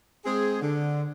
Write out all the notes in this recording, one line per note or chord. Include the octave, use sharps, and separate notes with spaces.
G#3 C4 G#4
D3